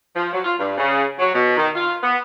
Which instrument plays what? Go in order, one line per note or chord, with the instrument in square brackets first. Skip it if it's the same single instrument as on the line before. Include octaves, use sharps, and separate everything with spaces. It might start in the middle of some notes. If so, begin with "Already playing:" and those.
[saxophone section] F3
F#3
F4
G2
C#3
F#3
B2
D#3
F4
B3